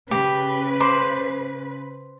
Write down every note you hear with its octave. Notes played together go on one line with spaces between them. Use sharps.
C#3 G4 B4
C5 B5 D6